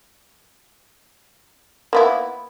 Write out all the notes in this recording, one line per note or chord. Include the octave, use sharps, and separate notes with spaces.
A#3 B3 E4